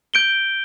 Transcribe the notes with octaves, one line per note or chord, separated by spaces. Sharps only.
G6 D7 G7